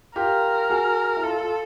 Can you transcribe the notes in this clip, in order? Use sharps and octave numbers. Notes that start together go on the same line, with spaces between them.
F4 G4 A#4
F#4 G#4
E4
F4 A4
F4